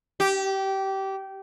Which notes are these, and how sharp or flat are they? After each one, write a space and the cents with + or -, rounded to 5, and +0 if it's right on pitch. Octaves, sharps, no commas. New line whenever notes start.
G4 -20